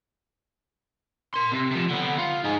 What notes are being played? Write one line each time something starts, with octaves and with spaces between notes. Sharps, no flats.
A#4 C6
C3
C3 F3
D3 B3
F4
D#4 G#4